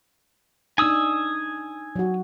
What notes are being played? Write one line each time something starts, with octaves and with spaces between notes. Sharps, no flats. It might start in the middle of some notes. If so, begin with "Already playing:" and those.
D4 D#4 G#5 D#6 E6
F#3 F#4